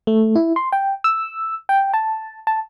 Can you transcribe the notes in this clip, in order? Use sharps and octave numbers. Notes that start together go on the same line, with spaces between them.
A3
E4
C6
G5
E6
G5
A5
A5